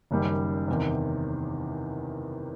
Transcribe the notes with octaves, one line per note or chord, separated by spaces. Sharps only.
F#1 F#2 D#3 G3
E2 C3 D#3